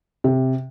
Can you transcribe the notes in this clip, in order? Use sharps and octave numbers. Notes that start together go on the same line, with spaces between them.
C3